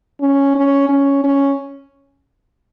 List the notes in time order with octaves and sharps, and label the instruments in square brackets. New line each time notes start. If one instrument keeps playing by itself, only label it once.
[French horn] C#4
C#4
C#4
C#4